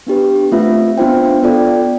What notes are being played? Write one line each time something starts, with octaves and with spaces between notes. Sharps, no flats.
B3 D4 G4 B4
A3 C4 F4 B4 E5
B3 D4 F4 C5 G5
B3 F4 A4 D5 G5